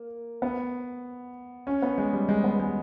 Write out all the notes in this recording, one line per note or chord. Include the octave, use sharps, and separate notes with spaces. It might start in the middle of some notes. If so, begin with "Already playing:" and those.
Already playing: A#3
B3
C#4
B3
G#3
G3
G#3
B3
G#3